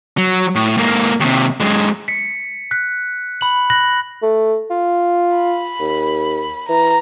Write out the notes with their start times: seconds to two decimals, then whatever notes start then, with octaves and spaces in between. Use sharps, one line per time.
0.18 F#3
0.55 A2
0.77 G#2 A#3
1.20 D#2 C3
1.60 F#2 G#3
2.08 B6 C#7
2.71 F#6 B6
3.41 B5 F#7
3.70 B5 F#6 A#6 F#7
4.22 A3
4.70 F4
5.37 B5
5.80 D#2
6.69 E3 A#5